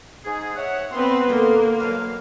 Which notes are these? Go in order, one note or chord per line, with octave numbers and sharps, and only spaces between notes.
G#2 D#4 G#4
C#5 E5 F#5
B3 C4 B4 C6
A#2 D3 A#3
F#3 B4 D#5 F5 A5